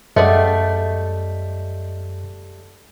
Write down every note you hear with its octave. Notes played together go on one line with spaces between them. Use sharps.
F#2 G3 A3 G#4 D#5 F#5